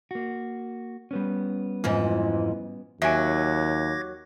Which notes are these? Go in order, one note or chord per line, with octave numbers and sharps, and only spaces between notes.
A#3 F#4
G3 B3 C#4
F2 G#2 E3
D#2 F#3 E5 G#5 D6 G#6 A#6